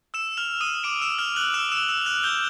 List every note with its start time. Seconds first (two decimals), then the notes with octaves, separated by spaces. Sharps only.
0.14 E6 E7
0.37 F6 F7
0.61 D#6 D#7
0.84 D6 D7
1.02 E6 E7
1.19 F6 F7
1.36 F#6 F#7
1.54 E6 E7
1.72 E6 E7
1.89 E6 E7
2.01 F7
2.06 F#6 F#7
2.23 G6 G7